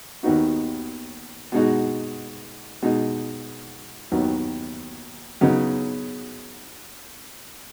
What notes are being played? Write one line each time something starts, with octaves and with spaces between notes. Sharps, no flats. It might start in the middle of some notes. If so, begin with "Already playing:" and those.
D#2 D#3 B3 D#4 F#4
B2 G#3 D#4 F#4
B2 G#3 D#4
D#2 D#3 F#3 B3
C#3 F#3 B3 D#4